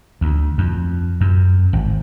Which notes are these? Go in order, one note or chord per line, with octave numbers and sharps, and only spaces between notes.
D2
F2
F#2
G#1